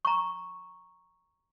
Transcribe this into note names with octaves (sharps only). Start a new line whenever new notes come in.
A#5 C#6